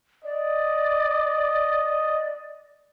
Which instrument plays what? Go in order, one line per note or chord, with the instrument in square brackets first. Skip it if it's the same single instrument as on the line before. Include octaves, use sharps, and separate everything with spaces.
[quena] D5 [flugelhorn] D#5